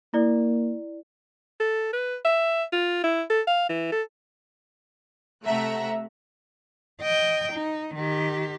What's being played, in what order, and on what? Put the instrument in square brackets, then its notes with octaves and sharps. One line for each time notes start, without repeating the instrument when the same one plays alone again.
[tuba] A#3 [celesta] E4 D5
[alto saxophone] A4
B4
E5
F4
E4
A4
F5
E3
A4
[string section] C3 A3 E5 F#5 A#5 F#6
[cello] D#5 G5
D#4
D#3 G4